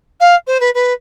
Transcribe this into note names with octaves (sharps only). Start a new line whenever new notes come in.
F5
C5
B4
B4